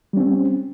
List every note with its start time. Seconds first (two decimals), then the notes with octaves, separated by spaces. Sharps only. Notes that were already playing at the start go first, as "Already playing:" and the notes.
0.13 G3
0.17 C#4
0.20 C4